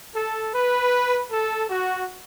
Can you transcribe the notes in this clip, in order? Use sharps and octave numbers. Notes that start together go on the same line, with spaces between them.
A4
B4
A4
F#4